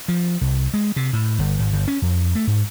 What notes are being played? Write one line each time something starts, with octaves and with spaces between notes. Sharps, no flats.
F3
C2
G#3
C3
A2
G1
G#1
G1
C#4
F2
A3
G#2